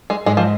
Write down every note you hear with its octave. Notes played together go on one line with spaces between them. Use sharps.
G#3
G#2 G#3
F3